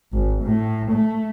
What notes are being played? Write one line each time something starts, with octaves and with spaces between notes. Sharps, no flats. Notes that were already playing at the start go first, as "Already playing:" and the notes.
G#1
A2
A3